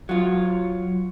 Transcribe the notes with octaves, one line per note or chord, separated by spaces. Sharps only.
F#3 F4